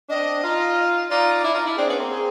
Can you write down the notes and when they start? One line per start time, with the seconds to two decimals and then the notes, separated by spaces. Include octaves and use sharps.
0.09 C4 D4 D#5
0.43 D#4 F4
1.10 D#4 F4 D5
1.43 D4 E4
1.54 D#4 F4
1.65 D4 E4
1.76 C4 D4 G#4
1.87 B3 C#4
1.98 A#3 C4
2.09 G#4